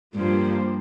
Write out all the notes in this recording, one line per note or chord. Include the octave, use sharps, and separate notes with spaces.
G2 F3 A#3 G4 C5